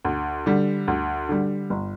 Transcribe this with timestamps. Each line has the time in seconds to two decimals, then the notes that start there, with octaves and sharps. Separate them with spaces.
0.04 D2
0.46 D3 G3
0.88 D2
1.29 D3 G3
1.70 G1